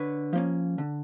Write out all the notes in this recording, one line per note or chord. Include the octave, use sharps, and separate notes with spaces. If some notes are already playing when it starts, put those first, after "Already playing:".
Already playing: D3 B4 C#5
F3 A#3 C#4
D3